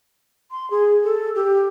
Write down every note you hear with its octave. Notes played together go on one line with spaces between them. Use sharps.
C6
G#4
A4
G4